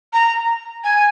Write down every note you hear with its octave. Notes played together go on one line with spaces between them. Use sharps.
A#5
G#5